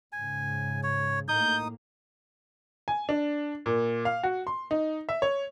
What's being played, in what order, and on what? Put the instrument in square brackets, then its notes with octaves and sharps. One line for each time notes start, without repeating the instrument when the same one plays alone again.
[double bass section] G#2 C#3 [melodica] G#5
[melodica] C#5
[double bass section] A2 A#3 [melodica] D#4 D#6 [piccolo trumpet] G6
[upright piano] G#5
D4
A#2
F5
F#4
C6
D#4
E5
C#5